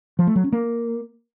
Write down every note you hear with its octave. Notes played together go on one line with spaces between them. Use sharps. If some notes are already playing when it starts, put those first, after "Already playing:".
F3
A3
F#3
C#4
A#3